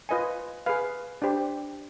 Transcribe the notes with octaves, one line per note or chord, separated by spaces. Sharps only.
F4 B4 D#5 G#5
G#4 B4 F5
D4 G4 C5